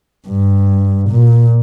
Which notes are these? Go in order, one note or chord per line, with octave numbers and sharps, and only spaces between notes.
G2
A#2